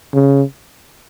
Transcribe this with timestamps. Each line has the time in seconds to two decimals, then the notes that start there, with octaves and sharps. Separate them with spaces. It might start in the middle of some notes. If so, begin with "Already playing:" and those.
0.14 C#3